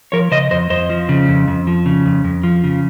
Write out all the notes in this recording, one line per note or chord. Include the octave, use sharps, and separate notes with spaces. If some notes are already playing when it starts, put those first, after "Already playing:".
F3 A#4 C#5
C#3 C5 D#5
F2 C5 D#5
F2 C5 D#5
F3
C#3
F2
F2
F3
C#3
F2
F2
F3
C#3